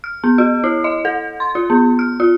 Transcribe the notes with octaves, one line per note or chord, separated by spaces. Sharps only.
F6
B3
F#4
E4
D#5
A4
C6
F4
B3
F6
F4